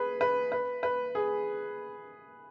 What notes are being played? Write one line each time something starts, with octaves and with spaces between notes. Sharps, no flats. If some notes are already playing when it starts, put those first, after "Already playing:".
Already playing: G#4 B4
B4
B4
B4
G#4